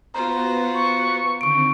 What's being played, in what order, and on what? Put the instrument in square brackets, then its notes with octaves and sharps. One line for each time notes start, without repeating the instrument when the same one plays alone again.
[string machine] B3 F#4 B4 [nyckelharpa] F4 C5 [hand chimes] A#5
[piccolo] C#6
[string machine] D3 D#3 C4 [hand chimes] C#6 D7